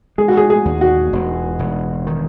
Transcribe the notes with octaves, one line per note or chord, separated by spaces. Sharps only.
G#3 G#4
F#4
G#4
G#4
D#2
F#4
E1
E1
D#3